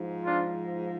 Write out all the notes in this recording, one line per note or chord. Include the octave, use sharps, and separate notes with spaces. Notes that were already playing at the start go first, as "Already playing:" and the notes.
Already playing: G#2 F3
D4 F4